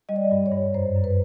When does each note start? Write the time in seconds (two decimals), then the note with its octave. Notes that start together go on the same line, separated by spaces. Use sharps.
0.09 G3 D#5
0.16 D5
0.31 G2
0.46 C#5
0.52 G2
0.74 F#2 C5
0.96 F#2
1.04 B4